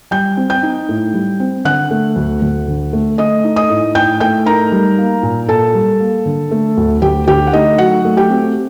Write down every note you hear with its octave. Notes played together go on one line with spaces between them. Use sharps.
G3 G5 G6
C4
G5 G6
D#4
A2
G3
C4
D3 F#5 F#6
A3
D2
D2
D3
A3
A3 D#5 D#6
D#4
D#5 D#6
A2
A2 G5 G6
A3 G5 G6
D#4 A#4 A#5
G3
A#3
A#2
A#2 A4 A5
G3
A#3
D3
A3
D2
D2 G4 G5
D3 G4 G5
F#5
A3 D#4 D#5
F#3 F#4 F#5
A3
G4 G5
C4